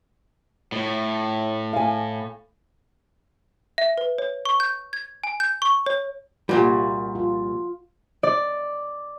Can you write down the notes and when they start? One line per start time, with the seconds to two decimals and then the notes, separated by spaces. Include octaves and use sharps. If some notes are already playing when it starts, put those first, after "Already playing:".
0.72 A2
1.73 F5 G#5
3.78 E5
3.98 B4
4.18 C#5
4.45 C#6
4.60 G6
4.93 G#6
5.24 G#5
5.40 G6
5.62 C#6
5.86 C#5
6.49 C2 A#2 G3 F4 F#4
7.15 F4
8.23 D5